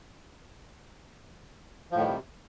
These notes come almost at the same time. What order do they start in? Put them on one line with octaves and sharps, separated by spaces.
F3 A2 D#3 G3 C3